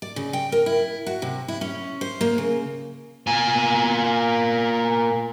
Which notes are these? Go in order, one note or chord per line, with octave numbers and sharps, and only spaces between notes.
D5
C#3
G5
A#4
E4
F#4
C3
E4
C#4
C5
A#3
C#3
A#2 G#5